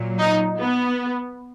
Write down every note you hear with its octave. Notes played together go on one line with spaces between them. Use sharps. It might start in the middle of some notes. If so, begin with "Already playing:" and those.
Already playing: A#2 F#3
D#4
B3